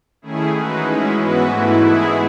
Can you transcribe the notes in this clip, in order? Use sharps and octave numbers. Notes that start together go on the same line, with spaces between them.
D#3 A3 C#4 E4 G#4
E3 G#3 D#4 F#4 B4
G#3 C#4 E4
G#2 E3 B3 F#4 B4
G#2 E3 A3 E4
G#3 B3 E4 G#4